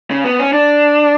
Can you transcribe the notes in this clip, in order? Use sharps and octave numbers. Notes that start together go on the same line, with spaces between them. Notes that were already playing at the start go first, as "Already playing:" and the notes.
C#3
B3
C#4
D4